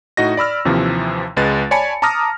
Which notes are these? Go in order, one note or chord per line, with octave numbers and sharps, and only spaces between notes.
A2 D#4 F#4 D#5 A#6
D5 B5 E6 F6
D#2 C3 E3 F3
C#2 G#3 B4 A6
C#5 D5 G#5 A5 B5 C#7
A5 A#5 D6 D#6 F6 A#6